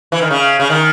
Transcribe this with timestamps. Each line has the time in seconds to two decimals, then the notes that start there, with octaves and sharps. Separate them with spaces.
0.12 E3
0.21 D#3
0.31 C#3
0.60 C#3
0.70 D#3